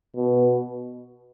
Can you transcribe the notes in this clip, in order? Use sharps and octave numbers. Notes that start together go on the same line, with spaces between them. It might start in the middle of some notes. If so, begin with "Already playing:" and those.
B2